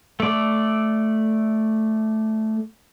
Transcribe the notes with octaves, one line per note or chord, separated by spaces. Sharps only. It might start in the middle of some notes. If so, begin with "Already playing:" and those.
A3 D5